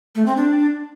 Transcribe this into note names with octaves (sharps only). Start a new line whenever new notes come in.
A3
C4
D4